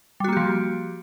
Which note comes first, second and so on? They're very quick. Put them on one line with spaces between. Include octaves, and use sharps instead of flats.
G3 F#4 A#3 G4 F3